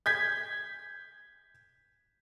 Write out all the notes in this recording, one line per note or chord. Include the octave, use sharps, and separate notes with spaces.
G6 G#6 B6